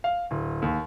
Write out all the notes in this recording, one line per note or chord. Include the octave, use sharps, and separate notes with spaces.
F5
D1
D#2